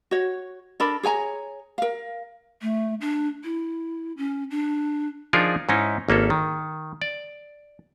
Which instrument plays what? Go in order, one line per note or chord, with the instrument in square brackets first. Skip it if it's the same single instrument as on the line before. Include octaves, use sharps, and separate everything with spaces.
[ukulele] F#4 C#5
D4 A4 A#4 B5
G#4 C#5 G#5 A#5
A#4 F5
[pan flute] A3
D4
E4
C#4
D4
[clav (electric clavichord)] F3 D4 D#4 F4 G#4 A#4
G#2 C#4 D#4 E4
G#1 A#3 C#4 A4
D#3
D5